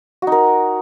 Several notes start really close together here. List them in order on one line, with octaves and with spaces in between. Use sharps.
F#4 D#4 A#4